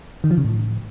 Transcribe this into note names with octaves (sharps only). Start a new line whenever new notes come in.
D#3
F3
C#3
A2